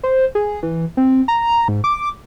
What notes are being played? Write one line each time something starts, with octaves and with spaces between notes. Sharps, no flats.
C5
G#4
E3
C4
A#5
G#2
D6